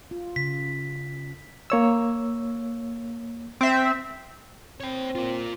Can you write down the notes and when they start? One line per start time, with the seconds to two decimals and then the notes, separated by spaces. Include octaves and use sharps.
0.11 F4
0.36 C#3 B6
1.70 A#3 C#5 E6
3.61 C4 E5
4.81 C4 C#5 G5
5.15 F4 A#4